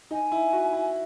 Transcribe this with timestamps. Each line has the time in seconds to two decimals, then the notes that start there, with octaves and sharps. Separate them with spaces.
0.11 D#4 G#5
0.32 E4
0.53 F#4
0.73 E4